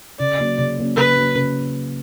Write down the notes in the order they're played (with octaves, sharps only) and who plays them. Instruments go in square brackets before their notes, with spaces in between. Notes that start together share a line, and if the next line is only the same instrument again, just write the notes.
[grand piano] C#3 [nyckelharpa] D5
[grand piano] F#3 A#3 C#4
C#3
F#3 A#3 C#4
[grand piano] C#3 [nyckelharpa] B4
[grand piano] F#3 A#3 C#4
C#3